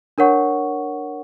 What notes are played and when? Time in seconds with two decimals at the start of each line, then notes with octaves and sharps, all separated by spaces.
0.18 D4 A#4 C#5 F#5 C#6